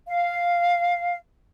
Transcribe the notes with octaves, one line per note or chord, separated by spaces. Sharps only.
F5